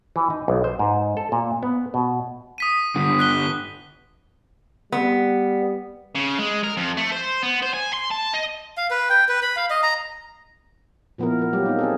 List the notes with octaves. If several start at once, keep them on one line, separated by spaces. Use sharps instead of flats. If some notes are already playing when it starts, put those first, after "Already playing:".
E3
D#4
B1
C5
G#2
A4
A#2
B3
B2
D#6 B6 D#7
G2 D3
F#6 B6 G7
G3 B3
C#3
G#3
A#4
F2
A3
C5
B3
C5
G#5
C6
A5
D#5
F5
B4
G5
B4
B5
F5
D#5
A#5
A#2 F3 B3 E4 A#4
F3 A#4
F#3 G3 A#3 G4
C4 D#4
C4 G#4 A4